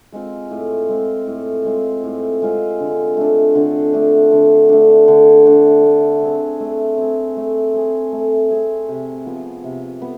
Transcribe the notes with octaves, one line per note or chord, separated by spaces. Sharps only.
G#3 C4 F4
A2
G#3 C4 F4
A2
G#3 C4 F4
A2
G#3 C4 F4
D3
A3 D4
D3
A3 D4
D3
A3 D4
D3
A3 D4
A3
C4 G#4
A3
C4 G#4
A3
C4 G#4
A3
C4 G#4
C3
F3 B3
C3
B3